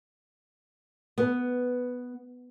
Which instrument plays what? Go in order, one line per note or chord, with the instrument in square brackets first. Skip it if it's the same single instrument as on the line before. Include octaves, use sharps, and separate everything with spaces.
[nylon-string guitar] B3